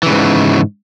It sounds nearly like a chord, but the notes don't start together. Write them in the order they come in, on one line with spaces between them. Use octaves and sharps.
E3 C#3 G#2